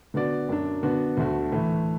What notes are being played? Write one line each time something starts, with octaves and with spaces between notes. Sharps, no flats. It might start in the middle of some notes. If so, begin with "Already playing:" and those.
D3 B3 F#4 D5
F#2 F#3 D4
D3 B3 D4 F#4
D2 D3 A3 F#4
A2 E3 A3